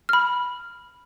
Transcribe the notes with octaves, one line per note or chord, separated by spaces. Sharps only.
B5 F6